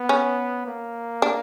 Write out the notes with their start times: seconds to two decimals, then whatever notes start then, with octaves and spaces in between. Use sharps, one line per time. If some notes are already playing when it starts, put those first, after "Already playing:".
Already playing: B3
0.09 C#4
0.67 A#3
1.22 D4